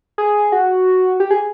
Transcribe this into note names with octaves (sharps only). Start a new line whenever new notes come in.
G#4
F#4
G4
G#4